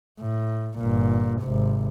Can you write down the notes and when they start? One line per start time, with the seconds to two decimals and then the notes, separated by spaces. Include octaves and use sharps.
0.20 A2
0.79 G1 A#2
1.42 G#1 C3